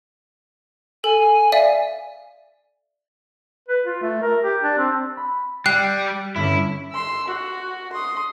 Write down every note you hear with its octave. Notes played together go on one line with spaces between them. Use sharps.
A4 G#5
D5 E5 F5
B4
F4
A3
A#4
G4
D4
C4
B5
G3 G5 F#6 C7
G2 D3 C#4 E4
C6 E6
F#4
C6 D#6